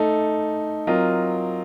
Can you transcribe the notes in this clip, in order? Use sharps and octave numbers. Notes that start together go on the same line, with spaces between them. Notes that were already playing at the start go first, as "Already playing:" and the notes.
Already playing: A3 D#4 A4
F#3 C4 F4 A#4 D#5